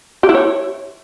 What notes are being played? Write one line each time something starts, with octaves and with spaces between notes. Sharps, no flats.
G4
E4
C#5